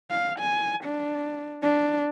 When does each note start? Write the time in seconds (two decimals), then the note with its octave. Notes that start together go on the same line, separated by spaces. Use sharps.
0.11 F5
0.39 G#5
0.84 D4
1.63 D4